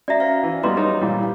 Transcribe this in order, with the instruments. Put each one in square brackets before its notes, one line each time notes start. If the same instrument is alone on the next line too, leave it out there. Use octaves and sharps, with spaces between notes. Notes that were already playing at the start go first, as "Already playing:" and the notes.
[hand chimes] C#4 F#4 A#5 [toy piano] D5 E5
[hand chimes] C5 F5
[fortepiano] E3
[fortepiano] F#3 G3 B3 [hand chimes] D#5 [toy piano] A#5 C6
[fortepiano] D#4 [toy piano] G#4 [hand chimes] C#5
[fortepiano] A#2 E3 G3